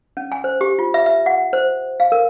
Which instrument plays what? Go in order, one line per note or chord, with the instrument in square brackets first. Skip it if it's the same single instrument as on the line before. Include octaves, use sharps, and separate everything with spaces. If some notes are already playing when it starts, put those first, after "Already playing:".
[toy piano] C#4
G#5
C5
G4
F4
E5
E5
F#5
C5
F5
A#4